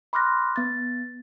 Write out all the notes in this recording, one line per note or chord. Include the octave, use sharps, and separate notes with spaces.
B5 C6 D6 F6 F#6 A#6
B3 A6